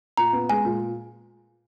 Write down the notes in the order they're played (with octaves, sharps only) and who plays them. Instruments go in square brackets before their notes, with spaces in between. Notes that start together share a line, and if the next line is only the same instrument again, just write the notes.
[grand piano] A#2 [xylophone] A#5
[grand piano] B3
[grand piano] G#3 [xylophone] G#5
[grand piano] A#2